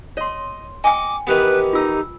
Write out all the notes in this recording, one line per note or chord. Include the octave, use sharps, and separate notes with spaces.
C#5 D#5 C6
D#5 G5 G#5 D6
D#3 E3 B3 G4 B4
D#4 F4 E6